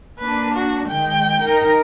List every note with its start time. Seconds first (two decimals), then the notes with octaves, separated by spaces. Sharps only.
0.19 A#3 D4 B4
0.54 F#4
0.88 D#3 G#3 G5
1.42 D#4 A#4